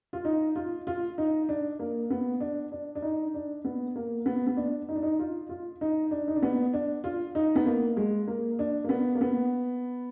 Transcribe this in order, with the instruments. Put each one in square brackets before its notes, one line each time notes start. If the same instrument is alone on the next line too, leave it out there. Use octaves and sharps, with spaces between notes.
[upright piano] F4
D#4
F4
F4
D#4
D4
A#3
B3
D4
D4
D4
D#4
D4
B3
A#3
B3
B3
D4
D#4
D4
D#4
F4
F4
D#4
D4
D#4
D4
B3
D4
F4
D#4
B3
A#3
G#3
A#3
D4
A#3
B3
A#3
B3